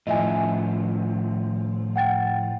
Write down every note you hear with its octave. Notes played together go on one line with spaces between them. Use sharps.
A2 F3 D#5 E5 G#5
G#5
F#5 G5 A6